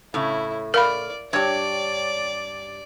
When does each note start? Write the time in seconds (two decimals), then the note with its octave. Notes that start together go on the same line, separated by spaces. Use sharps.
0.14 A2 C#3 E4
0.74 A#4 D5 F5 B5 F6
1.33 G2 G4 C#5 D5